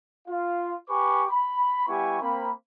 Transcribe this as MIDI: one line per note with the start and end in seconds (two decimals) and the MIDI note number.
0.28 0.74 65
0.28 0.74 77
0.89 1.24 67
0.89 1.24 71
0.89 1.24 80
0.89 1.24 85
0.89 1.24 86
1.30 1.85 83
1.88 2.21 55
1.88 2.21 59
1.88 2.21 64
1.88 2.21 67
1.88 2.21 80
1.88 2.21 85
2.21 2.48 58
2.21 2.48 60
2.21 2.48 83